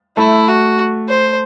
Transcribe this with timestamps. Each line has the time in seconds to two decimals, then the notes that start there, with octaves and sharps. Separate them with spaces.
0.17 A3 E4
0.48 F#4
1.09 C5